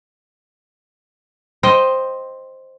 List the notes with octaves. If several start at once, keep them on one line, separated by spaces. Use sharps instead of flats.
C5 D#5 G5